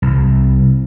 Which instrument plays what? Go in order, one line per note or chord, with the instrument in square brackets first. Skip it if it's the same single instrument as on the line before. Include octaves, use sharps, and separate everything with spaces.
[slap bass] C2